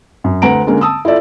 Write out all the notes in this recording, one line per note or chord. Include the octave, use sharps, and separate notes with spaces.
F#2
D2 B4 F#5 A#5 D7
D3 G#3 A#3 C#4
A5 D#6 E6
E4 F4 A4 D5 E5